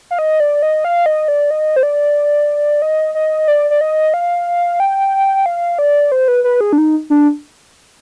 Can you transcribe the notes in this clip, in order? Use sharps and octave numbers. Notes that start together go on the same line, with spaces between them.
F5
D#5
D5
D#5
F5
D#5
D5
D#5
C5
D5
D#5
D#5
D5
D5
D#5
F5
G5
F5
D5
C5
B4
B4
G#4
D4
D#4
D4